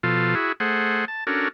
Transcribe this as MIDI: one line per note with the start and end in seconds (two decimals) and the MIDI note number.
0.03 0.35 47
0.03 0.35 53
0.03 0.35 65
0.03 0.35 69
0.35 0.52 64
0.35 0.52 66
0.35 0.52 68
0.60 1.05 57
0.60 1.05 68
0.60 1.05 72
0.60 1.05 78
1.08 1.24 81
1.27 1.48 61
1.27 1.48 62
1.27 1.48 66
1.27 1.48 69
1.27 1.48 70